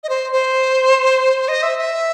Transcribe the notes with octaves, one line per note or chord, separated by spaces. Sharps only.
D#5
C5
C5
D#5
E5
E5